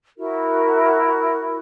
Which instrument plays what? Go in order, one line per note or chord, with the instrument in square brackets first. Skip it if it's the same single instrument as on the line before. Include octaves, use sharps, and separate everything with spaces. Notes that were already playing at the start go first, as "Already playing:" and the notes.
[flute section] E4 F#4 A#4